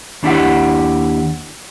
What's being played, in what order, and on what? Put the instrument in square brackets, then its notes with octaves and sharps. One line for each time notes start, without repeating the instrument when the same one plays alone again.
[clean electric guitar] D#2 D4 E4 G4 F#5